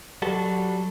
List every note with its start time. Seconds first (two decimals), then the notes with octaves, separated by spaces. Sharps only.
0.22 F#3 G3 F#4 A4